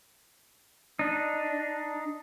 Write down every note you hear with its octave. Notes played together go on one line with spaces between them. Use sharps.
D4 D#4